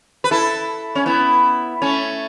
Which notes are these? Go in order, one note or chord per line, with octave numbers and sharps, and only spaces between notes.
B4
E4 A4
C#4
B3 E4
A3 C#4